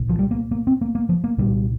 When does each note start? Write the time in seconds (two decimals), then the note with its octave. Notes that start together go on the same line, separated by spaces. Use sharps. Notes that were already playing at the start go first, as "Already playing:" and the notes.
Already playing: C2 A#2
0.09 F3
0.19 G3
0.31 A#3
0.51 A#3
0.67 C4
0.81 A#3
0.95 A#3
1.09 F3
1.24 A#3
1.38 C2 A#2 G3